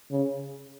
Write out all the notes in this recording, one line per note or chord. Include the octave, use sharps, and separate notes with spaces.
C#3